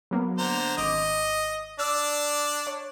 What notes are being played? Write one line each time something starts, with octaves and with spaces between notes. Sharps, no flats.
F#3 A#3 B3
D3 C5 A#5
G#1 D#5 D6
D4 D5 E6
C#5